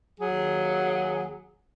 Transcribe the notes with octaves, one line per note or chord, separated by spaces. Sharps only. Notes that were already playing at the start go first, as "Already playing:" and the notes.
D#2 F#3 G#4